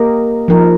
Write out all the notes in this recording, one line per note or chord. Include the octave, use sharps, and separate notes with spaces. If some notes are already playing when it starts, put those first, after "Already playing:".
Already playing: A#3 G4 A#4 D#5
F3 D#4 A#4